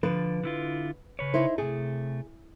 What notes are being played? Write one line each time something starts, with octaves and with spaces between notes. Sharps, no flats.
D3 F3 B4
D3 E4 F4
C#3 B4 C#5
D#4 E4 C5
C3 A3 G#4